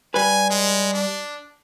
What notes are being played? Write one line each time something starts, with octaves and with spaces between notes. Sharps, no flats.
G3 B4 G#5
G#3
D4